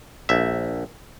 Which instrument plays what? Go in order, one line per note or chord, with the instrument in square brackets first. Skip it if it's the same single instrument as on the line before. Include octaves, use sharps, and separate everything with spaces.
[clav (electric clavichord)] A#1 E5